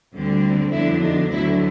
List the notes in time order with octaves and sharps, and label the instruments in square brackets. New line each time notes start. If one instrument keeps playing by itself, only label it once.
[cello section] D2 D3 G3 C4
F2 D3 F#3 B3 D4 E4
D#4
D2 D3 F#3 E4